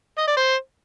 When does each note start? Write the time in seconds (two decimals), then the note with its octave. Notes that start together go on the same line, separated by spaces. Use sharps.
0.18 D#5
0.27 D5
0.37 C5